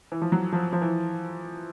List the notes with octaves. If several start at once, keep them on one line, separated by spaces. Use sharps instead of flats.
E3
F3
F#3
F3
F3
E3